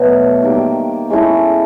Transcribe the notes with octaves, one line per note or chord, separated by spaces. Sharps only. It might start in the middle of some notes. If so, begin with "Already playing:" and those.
Already playing: B2 F#3 A3
D#3 G3 A#3
G#3 C#4 E4 A4